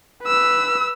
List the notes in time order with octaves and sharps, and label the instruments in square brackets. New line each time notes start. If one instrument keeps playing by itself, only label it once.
[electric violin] B4 E6